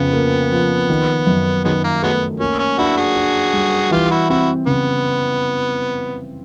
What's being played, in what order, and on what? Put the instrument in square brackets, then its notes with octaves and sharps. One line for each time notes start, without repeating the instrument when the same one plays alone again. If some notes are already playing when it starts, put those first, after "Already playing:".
Already playing: [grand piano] F2 C#3 [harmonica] B3
[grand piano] A#3
F3
D#3
F#2
[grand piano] D#3 [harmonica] F#3 G#3 B3
[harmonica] A#3
[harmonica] F#3 G#3 B3 [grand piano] A3
[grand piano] A#3 [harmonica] C#4
[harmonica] C#4
[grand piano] D4 [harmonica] E4 F#4
[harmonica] F#4 G#4
[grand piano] D4
G3
[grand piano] E3 [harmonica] F4 G4
[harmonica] E4 F#4
[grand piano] C4 [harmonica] E4 F#4
[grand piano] C#3 [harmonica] B3